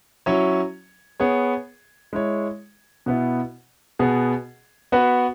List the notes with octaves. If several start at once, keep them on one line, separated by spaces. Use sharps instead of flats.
F#3 C#4 E4 C#5
B3 G#4 C#5
G#3 E4 C#5
B2 B3 E4
B2 B3 G#4
B3 F#4 B4